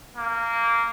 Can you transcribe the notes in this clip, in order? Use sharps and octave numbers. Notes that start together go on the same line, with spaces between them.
A#3